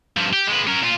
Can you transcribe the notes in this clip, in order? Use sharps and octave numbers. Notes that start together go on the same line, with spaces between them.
G2 F3
G4
G#3 B4
C#4 A#4
A#2 F4